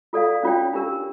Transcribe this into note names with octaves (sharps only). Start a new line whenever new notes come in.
F4 A4 D5 F5
C#4 F4 C#5 G5
D4 G4 A#4